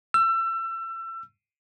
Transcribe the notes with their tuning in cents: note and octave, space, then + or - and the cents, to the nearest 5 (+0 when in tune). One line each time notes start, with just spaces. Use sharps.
E6 +30